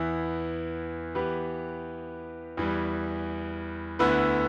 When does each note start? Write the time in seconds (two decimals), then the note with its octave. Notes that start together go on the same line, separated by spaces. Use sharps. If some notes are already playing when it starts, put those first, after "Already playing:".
Already playing: E2 E3 B3 E4
1.15 E3 B3 G4 B4
2.57 E2 E3 G3
3.99 D2 D3 B3 E4 B4